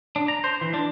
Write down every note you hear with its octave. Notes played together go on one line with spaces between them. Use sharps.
D4
A#5
C5
E3
D4